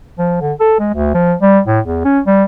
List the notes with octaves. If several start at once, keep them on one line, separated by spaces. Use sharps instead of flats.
F3
D3
A4
G#3
D2
F3
G3
A2
E2
C#4
G3